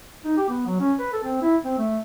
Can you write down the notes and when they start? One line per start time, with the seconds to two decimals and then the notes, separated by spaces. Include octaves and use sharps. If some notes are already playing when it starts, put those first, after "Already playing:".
0.25 D#4
0.37 G4
0.49 B3
0.66 F#3
0.80 C#4
0.99 B4
1.13 A4
1.25 C4
1.42 E4
1.65 C4
1.78 A3